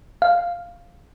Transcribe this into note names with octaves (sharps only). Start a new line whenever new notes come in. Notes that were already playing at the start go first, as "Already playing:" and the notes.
F5